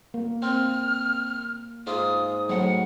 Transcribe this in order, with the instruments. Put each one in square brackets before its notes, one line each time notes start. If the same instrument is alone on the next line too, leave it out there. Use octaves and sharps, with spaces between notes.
[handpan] A#3
[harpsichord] C4 [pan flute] F6
[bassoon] G#2 [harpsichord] F4 [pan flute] D#6
[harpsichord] A2 [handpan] F#3 [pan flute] F#5